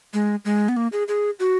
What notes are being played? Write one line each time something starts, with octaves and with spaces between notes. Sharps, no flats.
G#3
G#3
B3
A#3
G#4
G#4
F#4